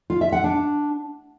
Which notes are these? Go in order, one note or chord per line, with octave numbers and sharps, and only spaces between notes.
F4
E5
F#5
D4